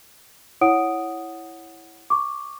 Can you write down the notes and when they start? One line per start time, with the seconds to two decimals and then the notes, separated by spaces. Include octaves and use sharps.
0.61 E4 C#5 F#5 D#6 D7
2.10 C#6 D6